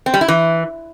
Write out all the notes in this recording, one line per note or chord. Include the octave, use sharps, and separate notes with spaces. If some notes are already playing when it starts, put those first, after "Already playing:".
C4
G3
E4
E3